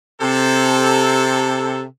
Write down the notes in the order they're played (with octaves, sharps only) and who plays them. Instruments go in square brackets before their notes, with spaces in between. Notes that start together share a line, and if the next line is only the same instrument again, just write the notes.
[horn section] C3 A4